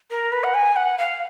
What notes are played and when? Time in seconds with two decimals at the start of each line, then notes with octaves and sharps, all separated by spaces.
0.11 A#4
0.32 B4
0.44 F#5
0.54 G#5
0.76 F#5
0.98 F5